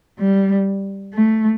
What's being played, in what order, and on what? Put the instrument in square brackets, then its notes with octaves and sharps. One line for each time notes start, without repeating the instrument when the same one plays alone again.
[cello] G3
A3